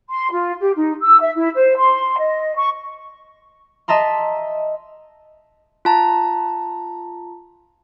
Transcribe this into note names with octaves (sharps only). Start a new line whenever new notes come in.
C6
F4
G4
D#4
E6
E5
E4
C5
C6
D#5
C#6
D#5 E5 A5 A#5 C6
F4 A5 A#5